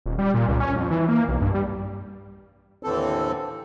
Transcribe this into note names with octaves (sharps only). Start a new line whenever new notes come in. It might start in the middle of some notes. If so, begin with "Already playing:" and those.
D#1
G3
A#2
C#2
C#4
F2
E3
A#3
B1
G2
G3
D#2 A2 D3 E3 C4 A4